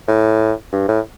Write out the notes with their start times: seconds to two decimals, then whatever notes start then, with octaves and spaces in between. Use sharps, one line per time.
0.08 A2
0.73 G2
0.89 A2